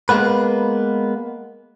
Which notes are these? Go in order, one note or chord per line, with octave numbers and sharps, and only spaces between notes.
G#3 A#3 B3 B4